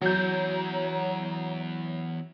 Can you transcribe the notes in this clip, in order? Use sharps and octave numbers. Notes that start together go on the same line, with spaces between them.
E2 F#3 C#5 A#5 G6